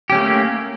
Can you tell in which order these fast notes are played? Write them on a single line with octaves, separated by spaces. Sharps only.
G4 C#4 A3 A#3